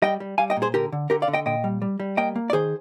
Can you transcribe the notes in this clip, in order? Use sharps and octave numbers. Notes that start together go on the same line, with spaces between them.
G3 D#5 G5
G3
G3 F5 G#5
D#5 G5
A#2
G#4 C5
D3 G4 A#4
D3
D3 G4 A#4
D5 F5
D3
D#5 G5
A#2 D#5 G5
G3
G3
G3
A#3 D#5 G5
A#3
D5
D#3 G#4 C5